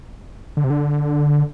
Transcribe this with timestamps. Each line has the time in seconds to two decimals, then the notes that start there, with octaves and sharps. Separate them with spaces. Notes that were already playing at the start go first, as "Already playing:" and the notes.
0.57 D3
0.64 C3
0.70 D3